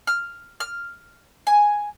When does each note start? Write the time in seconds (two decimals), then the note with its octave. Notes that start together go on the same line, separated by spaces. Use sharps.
0.07 F6
0.60 F6
1.47 G#5